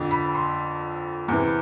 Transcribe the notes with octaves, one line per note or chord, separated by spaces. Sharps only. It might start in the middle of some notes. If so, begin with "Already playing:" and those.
Already playing: F2 D3 F3
B5
C6
E2 C3 E3